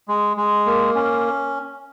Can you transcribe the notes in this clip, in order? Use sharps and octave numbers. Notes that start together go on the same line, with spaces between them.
G#3
G#3
A#3
C#4